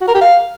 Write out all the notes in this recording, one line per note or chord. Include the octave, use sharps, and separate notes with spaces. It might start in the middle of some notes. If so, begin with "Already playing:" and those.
F#4
A#4
G4
F5